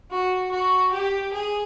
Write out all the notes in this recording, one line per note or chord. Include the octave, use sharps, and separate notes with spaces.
F#4
F#4
G4
G#4